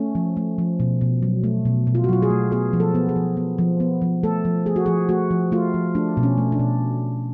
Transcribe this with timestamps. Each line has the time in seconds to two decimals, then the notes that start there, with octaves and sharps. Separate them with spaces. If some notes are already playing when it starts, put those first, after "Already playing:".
Already playing: A3 C#4
0.15 F3
0.37 A3
0.58 F3
0.80 B2
1.01 B2
1.22 F#3
1.44 A3
1.65 B2
1.87 B2
1.95 F4
2.04 F#4
2.09 F#3 F4
2.22 G#4
2.30 A3
2.52 B3 G#4
2.73 F3
2.80 A4
2.95 B3
3.09 G#4
3.16 F3
3.37 B3
3.58 F3
3.80 B3
4.02 F3
4.23 A3 A4
4.45 F3
4.66 A3 G#4
4.76 F#4
4.86 F3 G#4
5.09 A3 F#4
5.31 F3
5.52 A3 F4
5.74 F3
5.95 A3 D4
6.17 B2
6.23 C#4
6.38 A3
6.52 D4
6.59 B2